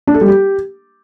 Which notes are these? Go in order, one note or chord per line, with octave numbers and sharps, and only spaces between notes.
D4
A4
G3
G4